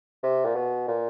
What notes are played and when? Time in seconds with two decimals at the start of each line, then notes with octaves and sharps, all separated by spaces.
0.23 C3
0.45 A#2
0.56 B2
0.88 A#2